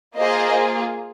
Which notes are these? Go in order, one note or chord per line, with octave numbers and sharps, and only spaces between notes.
A#3 F4 G#4 C5 D#5